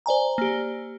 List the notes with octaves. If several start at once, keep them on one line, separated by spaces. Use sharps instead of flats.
C5 D5 G#5 A#5
A#3 G4